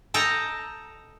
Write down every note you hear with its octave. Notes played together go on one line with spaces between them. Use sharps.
A4 D#5 G5 A#5